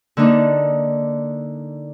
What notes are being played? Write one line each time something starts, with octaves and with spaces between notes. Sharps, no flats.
D3 A#3 D4 D#4